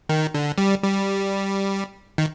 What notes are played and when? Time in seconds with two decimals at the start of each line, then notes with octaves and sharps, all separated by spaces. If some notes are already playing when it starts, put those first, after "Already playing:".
0.09 D#3
0.34 D3
0.58 G3
0.82 G3
2.18 D#3